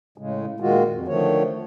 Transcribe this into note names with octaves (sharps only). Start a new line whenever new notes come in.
A2 C#3 G#3
A#2 D#3 G#3 F4 F#4
F2
D3 D#3 F3 A3 C#5